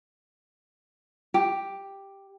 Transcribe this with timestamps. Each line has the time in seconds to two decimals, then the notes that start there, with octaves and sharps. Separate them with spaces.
1.34 G4